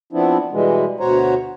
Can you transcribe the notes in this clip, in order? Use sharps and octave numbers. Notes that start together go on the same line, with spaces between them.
F3 B3 C4 D4 E4
B2 E3 G3 G#3
D2 B2 F#4 C5 C#5 A#5